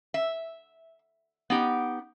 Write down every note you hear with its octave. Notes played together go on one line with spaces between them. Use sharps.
E5
B3 D#4 G4